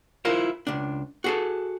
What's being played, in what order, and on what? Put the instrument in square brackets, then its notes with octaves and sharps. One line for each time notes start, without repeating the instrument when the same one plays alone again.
[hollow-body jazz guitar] E4 F4 A#4 C5
C#2 D4
F#4 G#4 A4